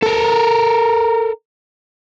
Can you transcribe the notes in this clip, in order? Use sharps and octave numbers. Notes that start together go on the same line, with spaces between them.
A4 A#4